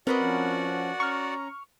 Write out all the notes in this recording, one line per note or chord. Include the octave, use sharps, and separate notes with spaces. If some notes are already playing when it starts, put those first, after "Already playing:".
C4 F#4 A#4 B4 D5 D#5 F#5
F3 C#4
C#4 A#5 C#6 F6